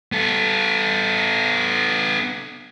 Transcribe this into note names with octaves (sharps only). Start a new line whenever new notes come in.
B3 A4